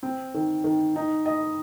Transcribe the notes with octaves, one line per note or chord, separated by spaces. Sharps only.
C4
D#3
D#3
D#4
D#5